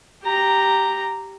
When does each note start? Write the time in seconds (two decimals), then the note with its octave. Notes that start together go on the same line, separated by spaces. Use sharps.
0.24 G4 A#5